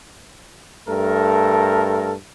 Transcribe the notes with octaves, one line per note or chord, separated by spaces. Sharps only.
G2 A3 A4 A#4